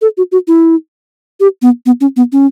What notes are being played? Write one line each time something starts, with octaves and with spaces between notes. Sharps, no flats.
A4
F#4
F#4
E4
G4
B3
B3
C#4
B3
C#4